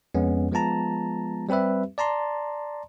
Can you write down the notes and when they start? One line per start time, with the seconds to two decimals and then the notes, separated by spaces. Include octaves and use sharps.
0.15 F2 G#3 B3 C#4
0.52 F3 G#3 B3 F4 A5 A#5
1.49 G3 C4 G4 B4 E5
1.98 D5 A5 A#5 C6